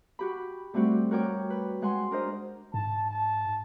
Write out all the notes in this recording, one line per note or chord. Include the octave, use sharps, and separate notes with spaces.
F#4 G4 B5
G3 A3 C4 F#4 G4
F#4 A#4 C#5 G5 D6
B4
G#3 F#5 G#5 C6
D4 A#4 C5 D#5
G#2 A5
A5